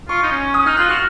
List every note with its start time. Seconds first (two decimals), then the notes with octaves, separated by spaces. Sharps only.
0.09 F4 C#6
0.23 D#4
0.32 C#4
0.54 C#4 D#6
0.66 D#4 F6
0.77 F4 F#6
0.89 F#4 F6